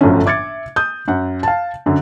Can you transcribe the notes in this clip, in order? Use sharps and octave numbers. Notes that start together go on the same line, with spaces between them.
G1 F#2 A2 D3 F3 C#4
E5 D6 G#6 A6 C#7
D#6 G6
F#2 F#5
F5 A5
F#2 D3